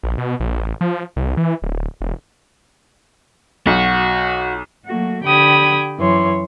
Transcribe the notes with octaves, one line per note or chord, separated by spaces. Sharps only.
A#1
B2
A#1
A1
F3
C2
E3
D1
E1
B1 F#4
F#3 A3 A#3 F#4
D3 G4 G5 B5 D#6 G#6
F#2 E3 C#5 C6